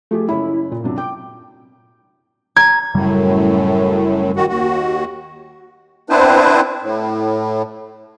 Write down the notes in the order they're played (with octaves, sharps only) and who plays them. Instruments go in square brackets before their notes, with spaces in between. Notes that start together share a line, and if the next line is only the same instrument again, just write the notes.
[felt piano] F3 G4 G#4 [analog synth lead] A3
[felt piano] F#1 C#4 B5 [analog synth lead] E4
[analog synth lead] A#2
[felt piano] C3 F#3 D4
[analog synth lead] G5 [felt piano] D6
[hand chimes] A#5 [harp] G#6
[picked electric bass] F#1 C#3 G3 [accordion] F#2 A2
[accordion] D#3 F#4
D#2 F#4
B3 C4 D4 E4 B4 C5
A2